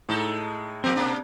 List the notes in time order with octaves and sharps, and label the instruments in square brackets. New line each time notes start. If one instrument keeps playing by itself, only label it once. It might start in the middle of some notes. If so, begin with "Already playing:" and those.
[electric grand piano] A2 [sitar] G#3 D#4 A4
[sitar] F3 A#3 A#4 [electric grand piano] C4
[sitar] B2 A#3 D4